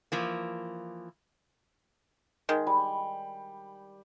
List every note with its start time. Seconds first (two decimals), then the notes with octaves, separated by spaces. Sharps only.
0.12 E3 F3 A#3
2.49 D#3 G#3
2.67 G3